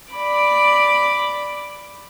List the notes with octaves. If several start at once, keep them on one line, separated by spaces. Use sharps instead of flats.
D5 B5 D6